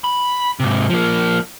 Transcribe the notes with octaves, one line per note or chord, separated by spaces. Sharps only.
B5
G#2 C3
F3 A#3